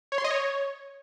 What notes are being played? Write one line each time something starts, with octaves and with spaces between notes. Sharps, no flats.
C#5
C6
D#5
C#5